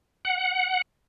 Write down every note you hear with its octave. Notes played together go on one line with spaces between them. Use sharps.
F#5